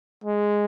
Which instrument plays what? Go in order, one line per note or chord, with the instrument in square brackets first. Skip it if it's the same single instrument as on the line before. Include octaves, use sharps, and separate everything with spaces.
[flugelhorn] G#3